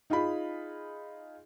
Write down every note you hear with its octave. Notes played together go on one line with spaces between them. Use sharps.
D#4 F4 G#4 B5